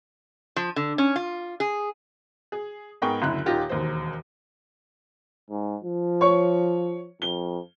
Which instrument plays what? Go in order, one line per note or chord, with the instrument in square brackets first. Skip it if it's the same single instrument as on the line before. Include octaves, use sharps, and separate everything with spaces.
[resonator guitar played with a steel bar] F3
D3
C#4
F4
G#4
[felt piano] G#4
G#2 B3 G#4 A#4 G5 C#6
F#1 D2 E4 F#6
D#1 D#3 F4 G4 A#6
E1 D#2 C5
[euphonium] G#2
F3
[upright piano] C#5 C#6
[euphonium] F2 [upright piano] G7